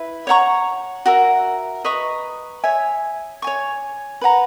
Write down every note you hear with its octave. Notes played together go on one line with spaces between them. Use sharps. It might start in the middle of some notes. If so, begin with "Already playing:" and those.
Already playing: E4 B4 E5
C#5 F#5 A#5 C#6
F#4 A#4 E5
B4 D#5 A#5 C#6
C#5 E5 G#5
C#5 G#5 C#6
B4 F#5 A#5